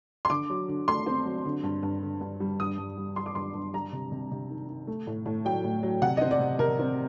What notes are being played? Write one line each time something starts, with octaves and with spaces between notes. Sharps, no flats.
C6
D3 D6
F#3
D3
A3 C6
C4
F#3
D3
G2
G2
D3
G2
G3
G2 D#6
G2
G3
G3 C6
D6
G2 C6
G2
G3 A#5
C3
C3
C3
D#3
D#3
A3
A2
A2
F#3 G5
A2
F#3
C3 F#5
C4 D#5
D5
C3
C3 A#4
C4